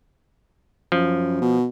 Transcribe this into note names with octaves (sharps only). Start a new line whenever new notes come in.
F#2 F3
B2